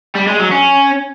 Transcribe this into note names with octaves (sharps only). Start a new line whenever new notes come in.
G3
G#3
F#3
C#4